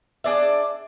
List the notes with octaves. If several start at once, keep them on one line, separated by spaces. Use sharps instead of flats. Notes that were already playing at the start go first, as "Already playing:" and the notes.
D4 G#4 D5 E5